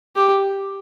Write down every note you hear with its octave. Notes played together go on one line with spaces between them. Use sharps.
G4